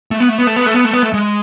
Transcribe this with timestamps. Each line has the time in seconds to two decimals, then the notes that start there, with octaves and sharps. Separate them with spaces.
0.11 A3
0.20 B3
0.29 A3
0.38 B3
0.47 A3
0.56 B3
0.66 A3
0.74 B3
0.85 A3
0.94 B3
1.03 A3
1.14 G#3